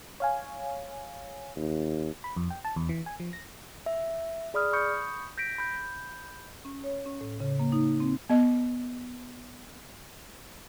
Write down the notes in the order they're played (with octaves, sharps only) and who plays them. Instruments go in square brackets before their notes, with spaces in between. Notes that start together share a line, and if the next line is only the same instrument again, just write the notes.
[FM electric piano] C#5 F5 G#5
[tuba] D#2
[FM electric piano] B5
F2
G5
A5
E2
E3
G#5
F3
A#6
[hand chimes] E5
G#4 D5 B5 D#6 F6
B5 C#6 D#6 G6 C#7
G6 A#6 B6 D7
B5 G6
[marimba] C#4
C#5
C#4
A2
C#3
A#3
D#4
C4
[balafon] B3 D#5